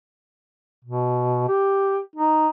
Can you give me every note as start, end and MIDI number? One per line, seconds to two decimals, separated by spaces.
0.84 1.45 47
1.48 1.98 67
2.16 2.49 63